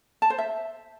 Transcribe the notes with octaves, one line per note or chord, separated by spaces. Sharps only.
A5
C5
E5